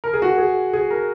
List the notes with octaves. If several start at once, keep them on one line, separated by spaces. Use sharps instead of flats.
A#4
G#4
F#4
G#4
G#4
A#4